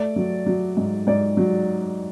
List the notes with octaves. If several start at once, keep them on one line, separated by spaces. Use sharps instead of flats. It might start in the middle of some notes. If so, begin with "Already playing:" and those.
Already playing: A3 D5
F#3
F#3
G#2
G#2 D5
F#3